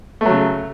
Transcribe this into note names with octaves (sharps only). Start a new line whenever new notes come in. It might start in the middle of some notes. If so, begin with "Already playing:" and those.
C#3 F#3 A3